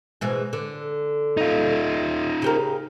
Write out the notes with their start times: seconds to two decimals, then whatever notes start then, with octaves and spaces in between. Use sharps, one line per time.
0.21 B2 E3 G#3
0.53 D3
1.37 D#4 F4
2.42 C#3 G4 A#4